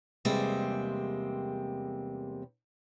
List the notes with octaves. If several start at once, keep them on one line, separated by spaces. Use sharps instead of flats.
E2 C3 G3 G#3 A#3 C4